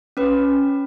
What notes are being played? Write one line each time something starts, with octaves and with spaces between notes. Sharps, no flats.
C#4 B4